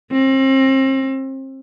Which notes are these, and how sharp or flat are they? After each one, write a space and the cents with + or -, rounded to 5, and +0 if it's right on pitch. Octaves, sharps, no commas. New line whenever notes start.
C4 +35